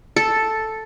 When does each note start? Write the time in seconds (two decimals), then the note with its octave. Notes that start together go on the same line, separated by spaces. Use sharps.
0.16 A4